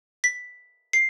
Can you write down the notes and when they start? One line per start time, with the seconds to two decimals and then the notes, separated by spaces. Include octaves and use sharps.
0.24 B6
0.93 C7